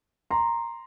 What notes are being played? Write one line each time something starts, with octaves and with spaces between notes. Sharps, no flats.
A#5 C6